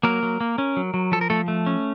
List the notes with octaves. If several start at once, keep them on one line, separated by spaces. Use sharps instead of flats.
F#3 A#3 A#4
F#3
A#3
C#4
F#3
F#3
F3 A4
A#4
F3 A3 A4
A3
C#4